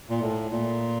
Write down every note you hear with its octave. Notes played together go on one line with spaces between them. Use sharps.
A#2
A2
A#2